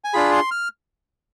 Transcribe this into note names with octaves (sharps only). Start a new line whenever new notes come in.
G#5
D4 F4 G#4 B5
C6
F6